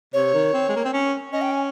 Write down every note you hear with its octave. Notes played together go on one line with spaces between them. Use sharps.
C3 C#5
D#3
C4
G#3
A#3
C4
C#4
C#4 D#5
G5
G#5